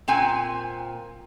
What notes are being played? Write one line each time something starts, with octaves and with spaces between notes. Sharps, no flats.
A#2 C4 G#5